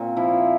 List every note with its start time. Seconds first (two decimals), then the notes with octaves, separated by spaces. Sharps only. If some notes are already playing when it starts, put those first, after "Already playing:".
Already playing: A#2 C4
0.17 F3 E4